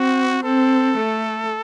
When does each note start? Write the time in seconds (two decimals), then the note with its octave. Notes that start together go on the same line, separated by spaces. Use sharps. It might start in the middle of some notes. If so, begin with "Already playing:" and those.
Already playing: C4 F#4
0.44 C4 A4
0.97 A3